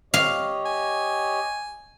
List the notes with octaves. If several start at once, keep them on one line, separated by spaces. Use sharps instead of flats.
G4 C#5 D#5 F5
G#5